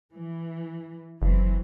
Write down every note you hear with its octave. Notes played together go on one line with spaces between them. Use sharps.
E3
F#1 E3 F#3 C4